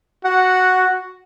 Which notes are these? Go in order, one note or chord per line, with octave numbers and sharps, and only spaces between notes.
F#4 F#5